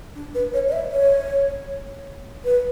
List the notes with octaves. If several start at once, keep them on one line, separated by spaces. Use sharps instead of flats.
D4
B4
C#5
D5
E5
C#5
B4